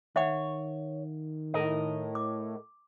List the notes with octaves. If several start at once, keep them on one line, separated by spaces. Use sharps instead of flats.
D#3 C#5 E5 F#5
A2 A#4 D#5
D6